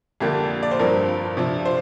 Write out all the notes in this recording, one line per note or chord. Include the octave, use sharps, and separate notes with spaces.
F2 D3 A#3 D4 G4
D5
C5
G2 F3 C4 A#4
C3 F3 D4
C5